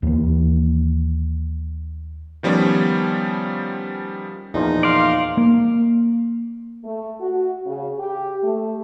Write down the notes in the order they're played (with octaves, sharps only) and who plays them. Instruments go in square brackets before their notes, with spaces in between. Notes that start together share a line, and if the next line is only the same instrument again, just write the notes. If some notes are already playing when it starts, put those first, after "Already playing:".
[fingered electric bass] D#2 E3 G3 A#3
[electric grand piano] D#3 F3 G3 B3 C#4
[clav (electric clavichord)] E2 A#2 F3 [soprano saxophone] D#4
[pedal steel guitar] D5 F5 [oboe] C6
[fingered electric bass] A#3
[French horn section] A3
F#4
C#3
G4
A3